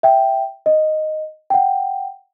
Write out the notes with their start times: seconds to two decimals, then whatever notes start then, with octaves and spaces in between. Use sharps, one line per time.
0.03 E5 G5
0.66 D#5
1.50 F#5 G5